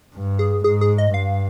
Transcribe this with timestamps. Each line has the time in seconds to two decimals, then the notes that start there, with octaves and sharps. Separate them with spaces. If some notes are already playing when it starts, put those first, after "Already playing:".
0.15 G2
0.39 G#4
0.64 G#2 G#4
0.81 G#4
0.98 D#5
1.14 G2 F5